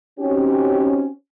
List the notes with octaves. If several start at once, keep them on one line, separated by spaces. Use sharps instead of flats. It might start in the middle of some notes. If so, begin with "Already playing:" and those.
C4 C#4 D#4 F#4 G4